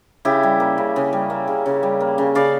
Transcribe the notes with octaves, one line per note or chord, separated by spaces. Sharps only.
C#3 E4 G4
G3
A#3
C#3
C#3
G3
A#3
C#3
C#3
G3
A#3
C#3
C#3 D5 F5